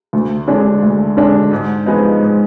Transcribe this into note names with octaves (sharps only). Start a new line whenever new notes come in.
D2
D3 G#3 D4
D2
D3 G#3 D4
G#2
F3 G#3 B3 D#4
G#2